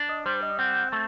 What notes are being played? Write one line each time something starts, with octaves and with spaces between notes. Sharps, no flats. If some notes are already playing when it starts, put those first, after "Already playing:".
Already playing: D4
D#5
G3 C5
D#5
C4 F#5
A3 A5